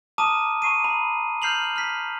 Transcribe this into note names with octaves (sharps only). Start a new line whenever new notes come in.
A5 A#5 D6 D#6 F6 D#7
A#5 C#6 C7 D#7
A#5 B5
F6 G6 C7 F7 F#7
F6 B6